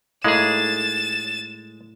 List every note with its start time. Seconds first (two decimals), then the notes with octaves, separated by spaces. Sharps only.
0.24 A2 G#3 A#3 D#4 G#4 A6 E7